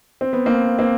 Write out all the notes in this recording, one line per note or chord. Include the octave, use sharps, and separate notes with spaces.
C4
B3
A#3 C4
A#3 C4